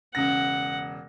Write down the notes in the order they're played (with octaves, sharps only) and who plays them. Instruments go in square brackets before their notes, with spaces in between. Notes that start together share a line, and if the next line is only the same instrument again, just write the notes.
[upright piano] E1 C#3 A#6 [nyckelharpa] F#5